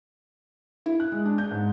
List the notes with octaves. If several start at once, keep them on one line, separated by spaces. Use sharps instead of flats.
E4
F#6
G#3
D4
G6
G#2